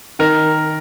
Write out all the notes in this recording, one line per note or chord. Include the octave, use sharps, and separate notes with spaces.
D#3 A#4